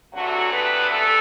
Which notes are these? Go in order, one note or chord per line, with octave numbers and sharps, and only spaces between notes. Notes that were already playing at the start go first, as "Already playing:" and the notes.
C3 E3 F#3 A3 D4 F#4
B3 B4
A3 A4